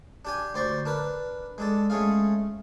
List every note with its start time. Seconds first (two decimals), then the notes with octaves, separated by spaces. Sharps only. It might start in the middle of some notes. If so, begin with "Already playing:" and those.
0.25 D4 G4 G#5
0.54 D2 C5 D5 C6 C#6
0.85 D4 A#4 B4
1.58 G#3 D4 A4
1.90 G#3 A3 C#4 G#4 F5